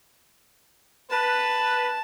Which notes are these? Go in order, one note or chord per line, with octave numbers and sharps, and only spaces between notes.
B4 A5